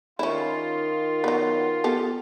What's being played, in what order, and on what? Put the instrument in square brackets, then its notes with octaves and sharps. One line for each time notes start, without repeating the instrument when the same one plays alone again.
[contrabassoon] D#3 [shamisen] C#4 E4 [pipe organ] F4
[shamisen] F#3 B3
B3 G4 A4